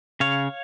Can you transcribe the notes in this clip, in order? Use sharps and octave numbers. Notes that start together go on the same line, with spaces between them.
C#3 C#5 F5